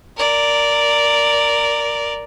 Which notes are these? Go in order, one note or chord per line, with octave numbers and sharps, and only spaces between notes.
A#4 D5